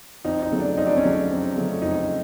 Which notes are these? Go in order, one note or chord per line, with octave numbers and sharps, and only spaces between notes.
F2 D#4
D#4
C#3 F#3 A3
D4
F2 D#4
D4
C#4
C#3 F#3 A3 D4
F2
C#3 F#3 A3
F2 D#4